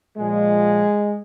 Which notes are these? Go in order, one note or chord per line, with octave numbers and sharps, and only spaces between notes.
A#2 F3 G#3